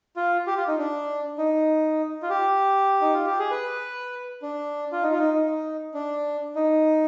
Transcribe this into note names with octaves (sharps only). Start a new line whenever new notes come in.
F4
G4
F4
D#4
D4
D#4
F4
G4
D#4
F4
G4
G#4
B4
D4
F4
D#4
F4
D#4
D#4
D4
D#4